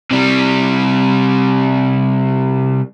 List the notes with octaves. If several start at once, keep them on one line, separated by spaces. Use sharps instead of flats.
C3 G3